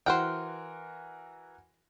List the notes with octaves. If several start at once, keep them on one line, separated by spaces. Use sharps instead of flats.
E3 F#4 A#4 C5 F#5 G5